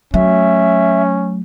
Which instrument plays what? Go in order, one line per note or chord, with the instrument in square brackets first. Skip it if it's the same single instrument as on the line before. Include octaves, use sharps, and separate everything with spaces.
[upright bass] F#3 A3 [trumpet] C#4 [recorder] E5